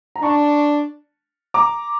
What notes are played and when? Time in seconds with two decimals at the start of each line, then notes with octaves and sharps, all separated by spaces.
0.16 A#5
0.22 D4 A5 C#6
1.54 A#5 D6